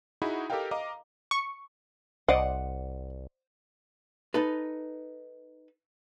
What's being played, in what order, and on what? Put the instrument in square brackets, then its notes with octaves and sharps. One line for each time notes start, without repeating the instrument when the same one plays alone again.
[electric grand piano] D#4 E4 F#4 G#4 F#5 B5
G4 A4 A#4 D#5 F5 G5
D#5 F5 A#5 D6
[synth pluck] C#6
[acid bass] C2 [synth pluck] C5 D5 D#5 [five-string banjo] F#5
[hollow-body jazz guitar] D#4 A4 B4